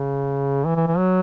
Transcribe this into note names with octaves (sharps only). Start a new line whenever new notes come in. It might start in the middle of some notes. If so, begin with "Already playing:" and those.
Already playing: C#3
E3
E3
E3
F#3